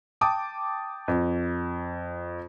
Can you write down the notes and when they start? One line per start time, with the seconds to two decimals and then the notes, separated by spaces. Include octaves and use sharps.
0.21 G5 A5 D6 D#6
1.08 F2